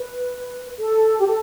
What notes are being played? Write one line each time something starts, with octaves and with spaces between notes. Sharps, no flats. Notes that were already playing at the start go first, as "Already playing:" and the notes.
Already playing: B4
A4
G4
A4